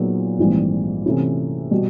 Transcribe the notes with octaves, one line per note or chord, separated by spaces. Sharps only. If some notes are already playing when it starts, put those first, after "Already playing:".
Already playing: A#2 F#3 B3 D#4 G#4
A#1 G#2 E3 G3 C4
C3 E3 A3 C#4 E4
B2 G3